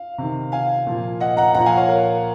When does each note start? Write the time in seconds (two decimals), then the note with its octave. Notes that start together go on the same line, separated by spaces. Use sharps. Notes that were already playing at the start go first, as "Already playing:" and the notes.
Already playing: F5
0.18 C3 D#3
0.52 F5 G#5
0.87 A#2 F3
1.20 D#5 F#5
1.37 F#5 A#5
1.54 A#2 F3 F#5 A#5
1.66 F5 G#5
1.77 C#5 F5
1.89 A#4